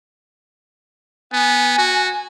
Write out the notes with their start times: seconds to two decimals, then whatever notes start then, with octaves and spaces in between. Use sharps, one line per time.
1.33 B3 G#5
1.78 F#4